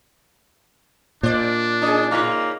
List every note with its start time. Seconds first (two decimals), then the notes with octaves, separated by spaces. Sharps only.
1.23 A#2 D4 C5 D5
1.82 C#4 G#4 D#5
2.11 C#3 A#3 D#4 F4